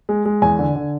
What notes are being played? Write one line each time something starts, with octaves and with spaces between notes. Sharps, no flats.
G#3
G#3
E2 G#5
D3
D3